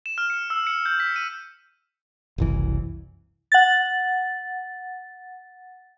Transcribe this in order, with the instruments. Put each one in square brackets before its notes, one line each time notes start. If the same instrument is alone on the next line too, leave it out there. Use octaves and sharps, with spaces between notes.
[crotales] E7
F6
C#7
E6
C#7
G6
B6
D#7
[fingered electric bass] F#1 C2 E3
[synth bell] F#5 A6